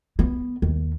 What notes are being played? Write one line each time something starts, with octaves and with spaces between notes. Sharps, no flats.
B3
D#2